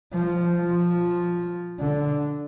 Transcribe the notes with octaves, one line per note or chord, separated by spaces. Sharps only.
F3
F3
D3